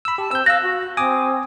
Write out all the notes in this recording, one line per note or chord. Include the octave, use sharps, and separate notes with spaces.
B5 E6
G4 A5
C4 E6 G6
F5 E6 F#6 A#6
F#4
C4 G#5 D6 D#6